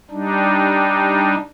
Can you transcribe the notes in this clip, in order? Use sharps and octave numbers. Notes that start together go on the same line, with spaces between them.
G3 D4 D#4